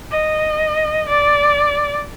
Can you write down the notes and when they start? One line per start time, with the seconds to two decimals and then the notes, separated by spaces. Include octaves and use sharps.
0.11 D#5
1.09 D5